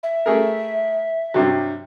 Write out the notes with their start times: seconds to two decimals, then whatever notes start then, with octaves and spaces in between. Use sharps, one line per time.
0.03 E5
0.26 A3 G#4 A#4
1.34 G2 C3 F#3